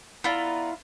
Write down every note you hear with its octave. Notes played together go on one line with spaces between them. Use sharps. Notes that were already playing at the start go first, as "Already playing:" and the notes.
B3 E4 F4 D5 A#5